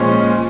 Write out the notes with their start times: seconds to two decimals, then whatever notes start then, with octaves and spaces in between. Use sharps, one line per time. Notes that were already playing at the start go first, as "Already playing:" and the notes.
Already playing: A#2 F3 G#3 C#4 F4